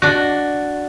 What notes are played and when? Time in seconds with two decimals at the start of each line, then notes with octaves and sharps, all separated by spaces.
0.02 D4 F#4